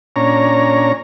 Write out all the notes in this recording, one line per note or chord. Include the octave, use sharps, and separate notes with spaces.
A#2 C#4 D4 C#5 A#5